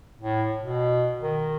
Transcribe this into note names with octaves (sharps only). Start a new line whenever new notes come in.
A2
B2
D#3